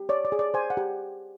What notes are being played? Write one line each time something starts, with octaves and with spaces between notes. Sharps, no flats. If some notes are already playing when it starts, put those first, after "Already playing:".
Already playing: G4
C#5 D5
D5
G#4
D5
C5 G#5
F#5
G4